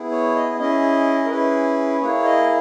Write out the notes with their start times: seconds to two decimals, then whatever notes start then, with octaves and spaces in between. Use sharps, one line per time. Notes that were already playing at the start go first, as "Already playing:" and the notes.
Already playing: B3 E4 G#4
0.12 C#5
0.36 D#5
0.59 C#4 E4 G#4 D#5
1.25 A#4
1.30 C#4 E4 G#4 B4
2.01 A#3 E4 G#4 C#5
2.25 D#5